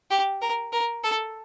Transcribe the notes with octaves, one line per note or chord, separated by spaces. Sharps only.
G4
A#4
A#4
A4